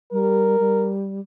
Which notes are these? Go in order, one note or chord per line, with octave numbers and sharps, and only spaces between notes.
G3 A#4
G3